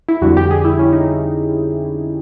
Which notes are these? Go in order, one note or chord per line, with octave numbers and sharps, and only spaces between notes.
E4
F2 D3 G3 F#4
G4
G#4
E4
C#4
D#4